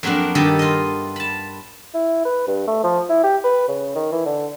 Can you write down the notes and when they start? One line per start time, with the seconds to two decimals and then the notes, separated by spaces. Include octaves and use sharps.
0.03 F2 F#3 A#3 B3 D4
0.35 G2 D#3 G4 A4 D#5
0.59 F4 D#5
1.16 A5 B5
1.94 E4
2.25 B4
2.47 G2
2.67 A3
2.84 F3
3.09 E4
3.23 G4
3.44 B4
3.68 C#3
3.96 D#3
4.12 E3
4.26 D3